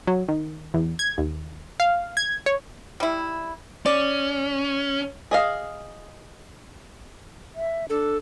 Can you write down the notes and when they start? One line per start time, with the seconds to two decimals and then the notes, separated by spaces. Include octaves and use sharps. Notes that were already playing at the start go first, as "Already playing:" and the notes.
0.07 F#3
0.28 D#3
0.74 E2
0.99 G#6
1.18 D#2
1.80 F5
2.17 G#6
2.46 C#5
3.00 G3 E4
3.86 C#4 D5
5.31 G#4 D#5 F5
7.55 E5
7.90 D4 A4